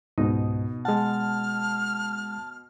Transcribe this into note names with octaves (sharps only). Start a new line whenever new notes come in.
C#2 G#2 B2 D#4
G#3 F#5 A5 F6